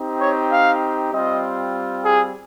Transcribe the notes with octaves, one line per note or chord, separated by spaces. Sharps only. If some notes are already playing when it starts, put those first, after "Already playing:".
Already playing: C4 D#4 G4
C#5
F5
G3 C4 F4 D#5
G#4